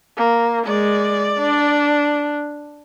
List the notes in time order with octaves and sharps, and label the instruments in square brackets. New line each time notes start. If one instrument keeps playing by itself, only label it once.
[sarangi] A#3
[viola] G#3 [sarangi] D5
[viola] D4